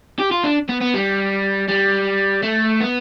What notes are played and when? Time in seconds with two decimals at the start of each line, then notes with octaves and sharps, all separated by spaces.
0.19 G4
0.31 F4
0.44 D4
0.69 B3
0.81 B3
0.94 G3
1.68 G3
2.43 A3
2.80 B3